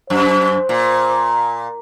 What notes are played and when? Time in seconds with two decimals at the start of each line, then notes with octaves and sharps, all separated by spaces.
0.10 F#2 C5
0.69 A#2